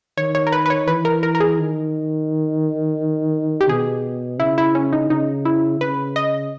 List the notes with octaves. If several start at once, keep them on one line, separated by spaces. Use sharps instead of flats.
D#3 C#5
C#5
A#4
B4
B4
C#5
E3 B4
A#4
A#4
A#4
G#4
D#3
G4
B2 G#4
C#3 E4
E4
C#4
D#4
C#3 D#4
E4
C#3 B4
D#5